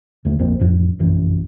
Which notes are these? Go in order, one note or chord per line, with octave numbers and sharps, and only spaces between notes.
D#2 D3 A3
A#1 F2 A#3 C4
A1 F2
F1 A#1 F#2 E3